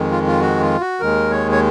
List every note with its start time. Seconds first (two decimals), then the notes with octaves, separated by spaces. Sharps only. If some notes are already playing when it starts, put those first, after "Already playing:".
Already playing: F2 D#3 G#3
0.11 F4
0.27 F4
0.40 F#4
0.61 F4
0.81 F#4
1.00 D#2 D#3 G#3 A#4
1.31 C#5
1.51 C#5